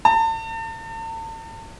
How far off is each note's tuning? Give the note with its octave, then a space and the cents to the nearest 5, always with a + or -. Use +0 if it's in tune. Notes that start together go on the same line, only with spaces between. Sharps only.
A5 +40